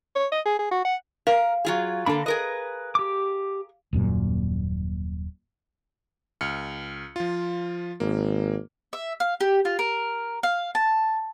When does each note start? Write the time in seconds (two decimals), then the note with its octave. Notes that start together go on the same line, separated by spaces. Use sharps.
0.15 C#5
0.32 D#5
0.46 G#4
0.59 G#4
0.71 F#4
0.85 F#5
1.27 A#4 F5
1.65 F#3 F4 G#4
2.06 D3 A#3 D4 A4 B5
2.26 G#4 A#4 B4 D#5
2.95 G4 D6
3.93 D#1 F#2 A#2
6.41 C#2 F6 C#7
7.16 F3 F4
8.00 G#1 A#3
8.93 E5
9.20 F5
9.41 G4
9.65 F4
9.79 A#4
10.43 F5
10.75 A5